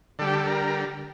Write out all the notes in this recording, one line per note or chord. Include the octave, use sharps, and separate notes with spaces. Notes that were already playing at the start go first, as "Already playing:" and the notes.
D3 G3 A4
G4
A4
A#4